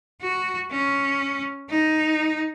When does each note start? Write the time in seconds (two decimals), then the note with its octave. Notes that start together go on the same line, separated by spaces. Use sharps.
0.22 F#4
0.71 C#4
1.70 D#4